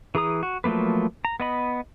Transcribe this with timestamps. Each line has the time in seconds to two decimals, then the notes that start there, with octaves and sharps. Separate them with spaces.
0.15 E3 G#4 A#5 D#6
0.43 F#4
0.64 F3 F#3 A3 A#3 B4
1.25 A#5
1.40 B3 D#5 B5